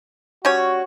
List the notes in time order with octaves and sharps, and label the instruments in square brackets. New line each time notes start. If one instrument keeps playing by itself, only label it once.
[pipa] G3 C#4 C#5 [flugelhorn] F#4